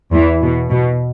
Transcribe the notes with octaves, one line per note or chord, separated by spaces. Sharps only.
E2 E3
B2
B2